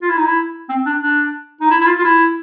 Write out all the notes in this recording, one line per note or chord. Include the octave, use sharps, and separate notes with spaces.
F4
E4
D#4
E4
C4
D4
D4
D#4
E4
E4
F4
F4
E4